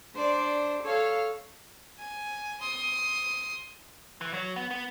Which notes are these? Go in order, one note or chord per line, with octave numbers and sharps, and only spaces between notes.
D4 C5 D5
A4 C#5 F5
G#5
C6 D#6
E3
F#3
B3
B3